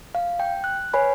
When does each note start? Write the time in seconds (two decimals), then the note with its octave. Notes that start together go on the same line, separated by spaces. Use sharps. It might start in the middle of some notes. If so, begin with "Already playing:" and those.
0.15 F5
0.40 G5
0.64 F#6
0.93 B4 C#5 G#5 B5